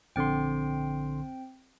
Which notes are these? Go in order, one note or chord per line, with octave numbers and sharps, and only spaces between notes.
A#1 D3 C4 G5 C6